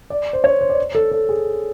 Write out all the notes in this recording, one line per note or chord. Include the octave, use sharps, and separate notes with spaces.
D5
C5
C#5
C5
D5
A4
A4
G#4